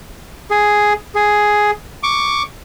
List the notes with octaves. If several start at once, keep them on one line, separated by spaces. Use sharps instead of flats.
G#4
G#4
C#6 D6